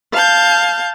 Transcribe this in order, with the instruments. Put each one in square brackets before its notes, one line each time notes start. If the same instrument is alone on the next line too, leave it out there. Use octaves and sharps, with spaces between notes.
[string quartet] F5 A5 G6